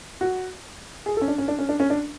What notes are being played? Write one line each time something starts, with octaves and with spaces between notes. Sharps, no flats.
F#4
G#4
A4
C#4
D4
C#4
D4
C#4
D4
C#4
D4